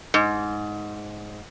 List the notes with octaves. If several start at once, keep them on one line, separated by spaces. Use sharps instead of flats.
G#2